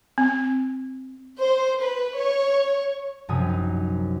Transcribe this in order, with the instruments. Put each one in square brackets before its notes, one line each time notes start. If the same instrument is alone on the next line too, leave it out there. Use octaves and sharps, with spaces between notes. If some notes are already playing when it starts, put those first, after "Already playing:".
[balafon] C4
[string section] C5
B4
C#5
[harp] A#1 F#2 C3 G#5 D#6
D#4